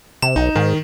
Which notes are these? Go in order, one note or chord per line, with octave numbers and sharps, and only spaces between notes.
C3 E7
B1 D#4
G#2 D#3